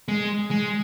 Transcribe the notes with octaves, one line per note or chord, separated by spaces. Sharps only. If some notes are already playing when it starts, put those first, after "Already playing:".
G#3
G#3